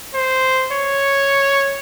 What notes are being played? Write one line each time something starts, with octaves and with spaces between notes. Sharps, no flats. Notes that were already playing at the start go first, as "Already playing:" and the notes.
C5
C#5